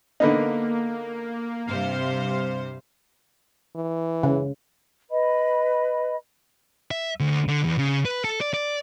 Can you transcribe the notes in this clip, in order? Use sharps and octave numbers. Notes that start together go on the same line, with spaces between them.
D3 A#3 B3 D#4
G2 C3 C5 F5
E3
C#3
B4 D#5 B5
E5
D2
D3
E2
C#3
B4
A4
D5
D5